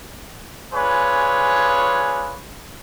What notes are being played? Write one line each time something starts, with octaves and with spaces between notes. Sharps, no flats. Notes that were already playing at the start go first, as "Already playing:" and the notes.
D4 F4 G#4 B4 C#5 G#5